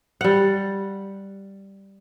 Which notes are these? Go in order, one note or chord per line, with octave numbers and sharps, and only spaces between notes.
G3 F#5